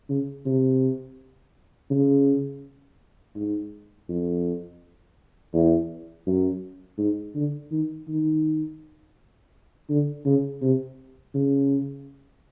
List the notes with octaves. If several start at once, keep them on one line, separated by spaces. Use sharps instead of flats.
C#3
C3
C#3
G#2
F2
E2
F#2
G#2
D3
D#3
D#3
D3
C#3
C3
C#3